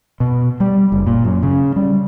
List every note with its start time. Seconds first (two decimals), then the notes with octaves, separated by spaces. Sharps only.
0.20 B2
0.60 G3
0.92 F#1
1.07 A#2
1.24 F#2
1.43 C#3
1.76 G3